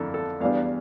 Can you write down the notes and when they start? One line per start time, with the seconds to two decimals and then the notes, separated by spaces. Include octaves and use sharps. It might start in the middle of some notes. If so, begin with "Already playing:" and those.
Already playing: F2 D3 E4 A4 A#4
0.14 A4
0.40 E2 E3 G3 D4 F5